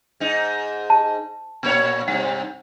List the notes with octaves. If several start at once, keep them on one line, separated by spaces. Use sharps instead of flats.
G#2 D#4
A5
A#2 A#3 C#5
G2 C3 F#5